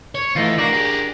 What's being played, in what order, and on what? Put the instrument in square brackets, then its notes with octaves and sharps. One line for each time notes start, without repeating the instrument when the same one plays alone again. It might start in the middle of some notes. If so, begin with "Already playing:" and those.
[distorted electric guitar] C#5
[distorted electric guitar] E3 [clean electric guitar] A3 D#4 F4
[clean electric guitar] D4 A#4 D5 [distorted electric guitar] F#4
[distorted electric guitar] G4 G#4